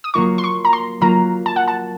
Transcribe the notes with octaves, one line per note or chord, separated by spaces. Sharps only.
D#6
F#3 A#3 F4 C#6
C6
C#6
A#5
C6
F#3 A#3 F4 A#5
A5
F#5
A5